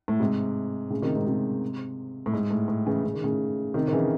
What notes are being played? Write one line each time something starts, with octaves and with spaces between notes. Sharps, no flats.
A2
G#2 C3
A2 C#3
C3 D#3
G#2 C3
G#2 C3
A2
G#2
A2
A2
C#3 E3
C#3
D#3
A2 C#3
C3 D#3
D#3
C#3 E3